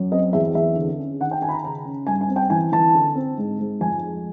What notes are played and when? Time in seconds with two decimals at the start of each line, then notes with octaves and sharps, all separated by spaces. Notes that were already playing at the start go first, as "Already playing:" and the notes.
Already playing: F#2
0.12 C4 D#5
0.33 E2 E5
0.54 E2 E5
0.76 D3
0.98 C#4
1.20 D#3 F#5
1.31 G5
1.41 D#3 G#5
1.49 B5
1.52 A#5
1.63 C#3 A#5
1.85 C#4
2.07 G2 G#5
2.21 G#5
2.29 C4
2.36 G5
2.50 E3 G#5
2.72 E3 A5
2.95 D3
3.15 C4
3.38 G#2
3.59 G#2
3.81 F2 G#5
4.03 G#3